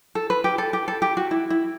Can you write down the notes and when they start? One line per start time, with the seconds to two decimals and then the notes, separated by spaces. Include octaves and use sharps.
0.15 A4
0.30 B4
0.44 G4
0.58 A4
0.73 G4
0.88 A4
1.02 G4
1.17 F#4
1.31 E4
1.50 E4